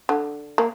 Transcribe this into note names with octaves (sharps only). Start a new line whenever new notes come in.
D3
A#3